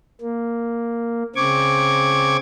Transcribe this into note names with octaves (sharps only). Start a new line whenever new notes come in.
A#3
C#3 C4 C#6 D6 G#6